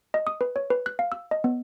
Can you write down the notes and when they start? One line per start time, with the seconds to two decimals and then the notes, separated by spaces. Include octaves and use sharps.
0.14 D#5
0.27 D#6
0.41 B4
0.56 C#5
0.70 B4
0.86 F#6
0.99 F5
1.12 E6
1.31 D#5
1.44 B3